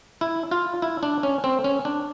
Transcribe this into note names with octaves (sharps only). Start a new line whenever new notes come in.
E4
F4
E4
D4
C#4
C4
C#4
D4